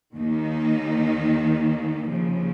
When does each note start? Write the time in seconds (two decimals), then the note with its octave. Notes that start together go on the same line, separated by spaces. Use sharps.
0.15 D#2 D#3 A#3 D#4
2.09 D#2 C#3 F3